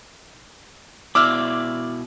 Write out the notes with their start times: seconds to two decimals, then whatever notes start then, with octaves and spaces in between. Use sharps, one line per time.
1.15 B2 E4 D5 D6 E6 F6